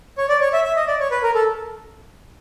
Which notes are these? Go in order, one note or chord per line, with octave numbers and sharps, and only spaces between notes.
C#5
D5
C#5
E5
E5
D#5
D5
C#5
B4
A#4
A4